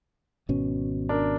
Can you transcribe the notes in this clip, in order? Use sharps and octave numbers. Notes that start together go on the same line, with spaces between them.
G#1 B2 C#4
D4 A#4